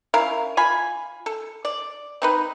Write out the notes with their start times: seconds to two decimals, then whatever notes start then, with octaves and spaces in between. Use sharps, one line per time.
0.14 C#4 E4 A#4 F5
0.57 F4 G#5 B5
1.26 A4
1.65 D5
2.22 C4 D#4 B4